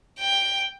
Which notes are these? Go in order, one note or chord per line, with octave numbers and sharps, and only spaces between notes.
G5